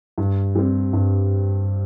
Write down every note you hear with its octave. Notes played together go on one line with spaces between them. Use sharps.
G2
G3 C4
G2